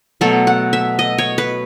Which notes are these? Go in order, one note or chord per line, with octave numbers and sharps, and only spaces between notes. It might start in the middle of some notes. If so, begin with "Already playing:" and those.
B2 F#3 A3 A4
F#5
E5
D#5
C#5
B4